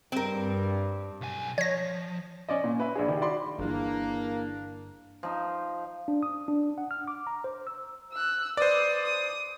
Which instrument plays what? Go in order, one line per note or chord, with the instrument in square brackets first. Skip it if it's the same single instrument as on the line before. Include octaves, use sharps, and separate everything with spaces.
[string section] G2 [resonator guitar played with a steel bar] C4 A#4
[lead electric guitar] B1 G#5
[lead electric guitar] F3 [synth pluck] C#5 A#6
[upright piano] C#4 D5 D#5
A#2
B4 E5
A#1 D4 G#4
D#3 G4
F#4 D5 B5 C6
[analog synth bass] G1 [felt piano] E3 G#4 [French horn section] A#3 [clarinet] D4
[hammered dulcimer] F3 D#4
[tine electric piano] D4
D#6
D4
F#5
F6
D6
A#5
C5
E6
[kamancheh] E6 F#6
[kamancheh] B4 D#6 [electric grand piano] C5 D5
[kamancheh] D#6